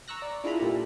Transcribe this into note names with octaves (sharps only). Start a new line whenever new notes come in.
A#5 C#6 E6 F#6 A#6
D5
D4 E4 F4 G#4 A#5 B5
A#2 G3 A4